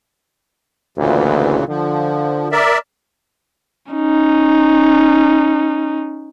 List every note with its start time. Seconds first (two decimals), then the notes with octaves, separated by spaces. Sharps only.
0.98 D2 A#2 C#3 E3
1.68 D3 F3
2.52 A#4 D5 E5
3.92 C#4 D#4